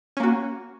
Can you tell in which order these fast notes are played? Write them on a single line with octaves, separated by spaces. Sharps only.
C#4 A#3 F#4